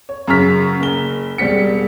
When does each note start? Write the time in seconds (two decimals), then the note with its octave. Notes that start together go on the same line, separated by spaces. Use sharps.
0.09 C#5
0.27 F#2 C#3 A#5 C#6 F6 B6
0.80 F#1 G7
1.38 E1 G3 C4 B6 C#7